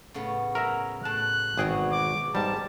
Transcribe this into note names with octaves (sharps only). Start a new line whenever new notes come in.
A2 C#3 B3
F#3 A#4 E5 A#5
A2 A5 F#6
G#1 B2 E3 F#3 G#4 G5
D6
G#2 G3 A#4 A5